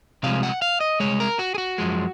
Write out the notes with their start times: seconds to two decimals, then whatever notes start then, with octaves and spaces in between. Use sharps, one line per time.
0.23 C2 C3 F3 G#3 F5
0.43 F#5
0.62 F5
0.81 D#5
1.00 C2 A#2 G#3 C#5
1.20 A#4
1.39 F#4
1.54 G#4
1.58 F#4
1.78 F#2 F3 G#3